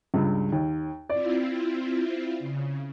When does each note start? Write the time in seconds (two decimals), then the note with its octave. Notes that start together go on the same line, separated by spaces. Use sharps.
0.14 C#2 G2
0.52 D#2
1.10 C4 E4 F4 D5
2.39 C#3